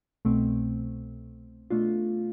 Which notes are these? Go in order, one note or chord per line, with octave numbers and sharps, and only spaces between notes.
C2 B2 A3 C4
B2 A3 D4 F4